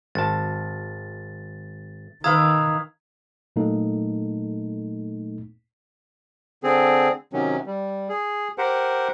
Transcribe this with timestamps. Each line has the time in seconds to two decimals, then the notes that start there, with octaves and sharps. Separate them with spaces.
0.15 G#1 A5 A6
2.24 D#3 B4 F5 A#5 D#6 E6 G#6
3.56 A#2 F#3 A3 A#3 D#4 A4
6.63 D3 C4 G#4
7.33 C3 D#3 F#3 C#4
7.66 G3
8.09 G#4
8.58 G4 A#4 C5 F#5